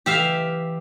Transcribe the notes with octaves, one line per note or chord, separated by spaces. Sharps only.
E3 G4 E5 F5